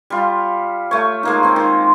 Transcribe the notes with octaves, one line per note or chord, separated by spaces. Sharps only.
G3 F4
A3 C#5
G#3 A#3 D#4
D#3 C4
D#3